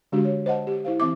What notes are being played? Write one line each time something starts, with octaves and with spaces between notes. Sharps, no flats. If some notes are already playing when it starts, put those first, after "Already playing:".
D3 G#3 D4 F#4 G4
C#5
C5 D#5 F#5 A5
G4
E4 C5 F5
E3 C4 E5 D6